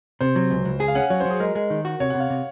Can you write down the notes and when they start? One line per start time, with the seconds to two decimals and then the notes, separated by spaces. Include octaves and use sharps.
0.21 C3 C5
0.36 F#3
0.50 C#2
0.65 C#2
0.80 G#4 G#5
0.88 F5
0.95 C#4 F#5
1.10 F#3 C#5
1.20 C5
1.25 F#3 G#4
1.40 G#3 A#4
1.55 G#3
1.70 D#3
1.85 F#4
2.00 C3 C#5
2.10 C3 F#5
2.20 F5
2.30 C3